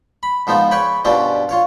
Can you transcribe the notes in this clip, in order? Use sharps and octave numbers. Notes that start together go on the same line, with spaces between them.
B5
G#2 F3 B3 D#4 F4
B4 C#5 G5 G#5 B5
G2 B2 G3 C4 C#4 F4
F4 C#5 F5